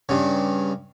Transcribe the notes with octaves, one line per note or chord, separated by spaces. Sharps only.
G2 C#3